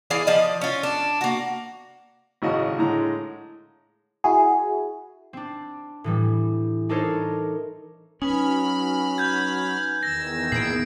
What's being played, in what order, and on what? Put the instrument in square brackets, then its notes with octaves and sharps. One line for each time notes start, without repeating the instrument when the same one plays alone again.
[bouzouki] E3 G#4 D5 F5
F3 D5 D#5
C#4 F4
D4
A#3 F#4
[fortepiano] G#1 A2 C#3 F#4 D#5
A2 D3 G#3 A#5
[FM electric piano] E4 F#4 G#4
[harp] C4 D4
A2 E3 G3
D4 D#4 A4 A#4 C5 C#5
[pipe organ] F#3 B5 F6 [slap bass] C#4 [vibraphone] D#4 B4 G#5
[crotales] G6 G#6
[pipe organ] E2 D#3 E6 [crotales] A#6
[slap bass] A#2 B3 [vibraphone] D#4 G#4 [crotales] C7 D7